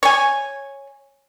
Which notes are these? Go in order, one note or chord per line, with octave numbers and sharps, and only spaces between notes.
C#5 G#5